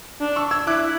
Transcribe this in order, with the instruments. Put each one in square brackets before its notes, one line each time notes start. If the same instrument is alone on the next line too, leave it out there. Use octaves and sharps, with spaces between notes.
[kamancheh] D4
[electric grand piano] C#6 E6
E6 G#6
[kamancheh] E4 [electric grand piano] D6 F#6